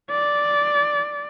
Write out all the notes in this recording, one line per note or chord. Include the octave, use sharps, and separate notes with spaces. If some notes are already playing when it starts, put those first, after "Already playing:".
D5